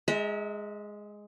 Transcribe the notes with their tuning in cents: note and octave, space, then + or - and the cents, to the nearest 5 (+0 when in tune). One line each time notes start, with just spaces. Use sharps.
G#3 +0 E5 -35 A#5 -20